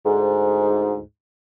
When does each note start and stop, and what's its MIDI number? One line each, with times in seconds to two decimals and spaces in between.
0.05 0.98 38
0.05 0.98 44